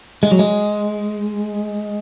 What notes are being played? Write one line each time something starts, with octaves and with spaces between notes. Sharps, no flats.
G#3
F#3
G#3